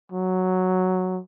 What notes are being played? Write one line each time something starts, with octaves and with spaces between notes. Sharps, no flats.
F#3